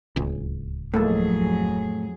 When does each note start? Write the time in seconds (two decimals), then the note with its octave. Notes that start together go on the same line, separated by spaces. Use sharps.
0.16 D1 C#2
0.94 F2 A2 F#3 G#3 A#3 G#4 A4